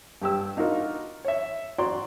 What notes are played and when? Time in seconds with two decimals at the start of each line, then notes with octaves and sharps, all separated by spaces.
0.22 G2 G4 E6
0.57 D4 D#4 F4 F#4 A#4
1.25 C#5 E5
1.78 F#4 D5 A#5 C6